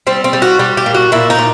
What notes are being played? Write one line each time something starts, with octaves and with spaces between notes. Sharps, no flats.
G3 C4
C4
G3
F#4
G3 G4
G4
A#2
F#4
A#2 E4
D#4
A#2